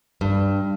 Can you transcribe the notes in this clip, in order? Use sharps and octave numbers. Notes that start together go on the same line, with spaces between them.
G2